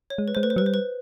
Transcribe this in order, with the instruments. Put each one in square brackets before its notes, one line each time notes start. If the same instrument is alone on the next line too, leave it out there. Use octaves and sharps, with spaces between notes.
[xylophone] C#5
[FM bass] G#3
[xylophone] B4
[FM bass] G#3 [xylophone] C5
[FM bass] A3 [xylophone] B4
[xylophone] C5
[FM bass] F#3 [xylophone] B4
[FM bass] G3 [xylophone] C5
[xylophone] B4